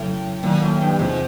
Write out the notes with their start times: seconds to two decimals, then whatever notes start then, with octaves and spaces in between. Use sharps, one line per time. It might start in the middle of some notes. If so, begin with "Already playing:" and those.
Already playing: F2 A2 C#3 F#3
0.43 A#2 D#3 F#3 A#3
0.62 A2
0.81 G2
0.99 E2 G#2 C3 F3